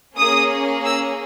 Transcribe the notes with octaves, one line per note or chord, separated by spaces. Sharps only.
A#3 C#4 G#4 D#6
E6